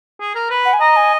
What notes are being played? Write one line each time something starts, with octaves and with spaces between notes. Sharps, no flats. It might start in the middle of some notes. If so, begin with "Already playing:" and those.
G#4
A#4
B4
F#5
G#5
D#5 A#5
G#5